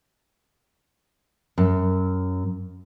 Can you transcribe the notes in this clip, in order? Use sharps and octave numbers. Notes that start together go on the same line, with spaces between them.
F#2